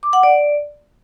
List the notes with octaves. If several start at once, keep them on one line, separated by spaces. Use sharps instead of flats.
D6
F#5
D5